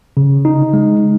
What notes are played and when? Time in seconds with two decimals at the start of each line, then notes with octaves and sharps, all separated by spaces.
0.17 C#3
0.45 D#4
0.73 G#3